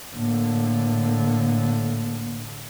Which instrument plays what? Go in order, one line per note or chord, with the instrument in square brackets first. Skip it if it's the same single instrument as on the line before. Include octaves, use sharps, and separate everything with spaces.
[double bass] A2 D3 [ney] A#3